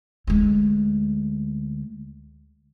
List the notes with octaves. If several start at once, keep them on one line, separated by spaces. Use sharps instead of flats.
D2 G#3